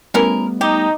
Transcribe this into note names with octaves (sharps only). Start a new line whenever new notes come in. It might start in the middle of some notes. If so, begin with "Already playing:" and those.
G3 A3 B3 C#4 E4 A#4
D#4 G4